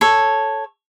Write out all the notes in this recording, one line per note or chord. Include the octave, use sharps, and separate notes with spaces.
A4 C#5